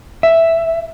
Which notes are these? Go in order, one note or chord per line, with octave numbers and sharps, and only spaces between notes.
E5